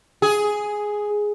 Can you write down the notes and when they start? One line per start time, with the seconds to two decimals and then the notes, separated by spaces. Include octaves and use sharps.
0.22 G#4